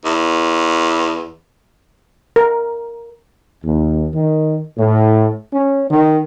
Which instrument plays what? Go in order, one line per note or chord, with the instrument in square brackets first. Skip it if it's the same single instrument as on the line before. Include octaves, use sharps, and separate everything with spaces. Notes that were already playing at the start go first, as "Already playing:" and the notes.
[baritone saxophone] E2
[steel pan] A#4
[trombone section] D#2
D#3
A2
C#4
D#3